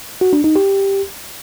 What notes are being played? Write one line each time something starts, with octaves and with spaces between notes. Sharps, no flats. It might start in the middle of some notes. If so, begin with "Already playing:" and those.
F#4
D4
D#4
G4